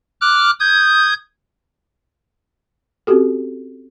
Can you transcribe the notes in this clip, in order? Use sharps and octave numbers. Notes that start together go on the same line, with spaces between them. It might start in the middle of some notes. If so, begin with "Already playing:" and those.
D6 F6 F#6
D#6 G6 G#6
C4 C#4 F#4 G4 A4